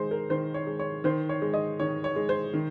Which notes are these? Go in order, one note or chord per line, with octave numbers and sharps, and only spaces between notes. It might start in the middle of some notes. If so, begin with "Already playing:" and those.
Already playing: D#3 G#3 C5
A#4
D#3 C5
C#5
G#3
C#5
D#3 C5
C#5
G#3
D#5
D#3 C#5
C#5
G#3
C5
D#3